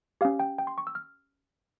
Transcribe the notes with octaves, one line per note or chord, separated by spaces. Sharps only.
C#4 G4 F5
G5
G5
C6
C#6
E6
F6